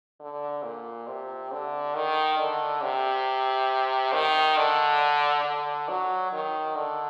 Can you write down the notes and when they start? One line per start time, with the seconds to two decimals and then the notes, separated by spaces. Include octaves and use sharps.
0.20 D3
0.63 A#2
1.07 C3
1.51 D3
1.95 D#3
2.38 D3
2.83 C3
4.13 D#3
4.57 D3
5.44 D3
5.89 F#3
6.32 D#3
6.75 D3